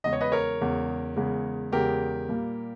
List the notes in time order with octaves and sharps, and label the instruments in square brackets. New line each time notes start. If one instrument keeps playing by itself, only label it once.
[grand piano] E2 C#3 G#3 D#5
C#5
B4 D#5
A#4 C#5
E2 C#3 G#3
E2 C#3 G#3
E2 C#3 G#3 G4 A#4
A#2 G3 A#3